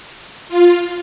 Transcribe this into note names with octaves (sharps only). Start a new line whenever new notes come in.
F4